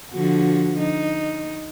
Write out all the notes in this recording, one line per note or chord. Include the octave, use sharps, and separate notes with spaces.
D3 F3 F#4
D#4